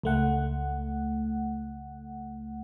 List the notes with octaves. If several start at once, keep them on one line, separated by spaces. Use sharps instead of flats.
C#2 A3 F#5